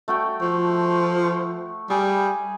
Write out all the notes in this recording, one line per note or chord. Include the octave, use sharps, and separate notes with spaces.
A3 F#4 G5
F3
G3 G#4